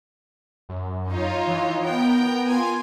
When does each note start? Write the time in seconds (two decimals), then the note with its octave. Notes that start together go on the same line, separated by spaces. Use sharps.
0.69 F#2
1.11 D#4 F4 C#5
1.47 E3
1.84 B3 A#4 G5
2.50 F4 G#5